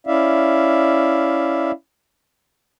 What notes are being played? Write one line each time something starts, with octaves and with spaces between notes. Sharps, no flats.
C#4 E4 D5 E5 F5